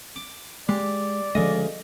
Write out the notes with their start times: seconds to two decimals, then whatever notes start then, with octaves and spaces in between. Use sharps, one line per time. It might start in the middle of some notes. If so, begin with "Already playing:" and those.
0.16 D6
0.69 G#3 G4 D5
1.35 D2 C#3 F3 G#3 D#5